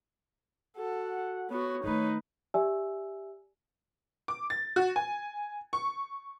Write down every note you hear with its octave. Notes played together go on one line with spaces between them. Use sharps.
F#4 A4 F#5
B3 F#4 C#5
D#3 A3 D#4 B4
G4 D5 E5 G#5 E6
D6
A6
F#4
G#5
C#6